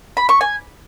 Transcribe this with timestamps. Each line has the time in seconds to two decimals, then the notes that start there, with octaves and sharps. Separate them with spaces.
0.17 B5
0.29 C#6
0.41 G#5